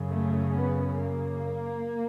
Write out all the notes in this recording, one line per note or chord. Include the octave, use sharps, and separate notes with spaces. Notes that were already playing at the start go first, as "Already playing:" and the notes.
Already playing: F#2 C#3
A3
B3
A#3